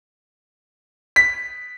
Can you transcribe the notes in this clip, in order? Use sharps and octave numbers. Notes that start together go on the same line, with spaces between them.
B6